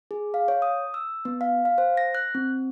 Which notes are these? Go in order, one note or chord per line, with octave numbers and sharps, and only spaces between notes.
G#4
F5
C#5
D#6
E6
B3
F5
F5
C5
A#6
F#6
C4